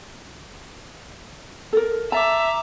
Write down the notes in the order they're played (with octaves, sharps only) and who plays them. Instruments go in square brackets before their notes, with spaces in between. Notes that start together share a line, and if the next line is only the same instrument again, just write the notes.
[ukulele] A4 A#4
[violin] E5 [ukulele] A5 [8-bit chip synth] A#5 D6